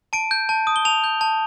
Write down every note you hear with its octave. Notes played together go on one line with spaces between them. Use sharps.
A5 D7
G6
A5
D#6
G7
A5 F7
G6
A5